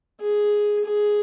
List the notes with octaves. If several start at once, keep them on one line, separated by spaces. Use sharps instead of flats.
G#4
G#4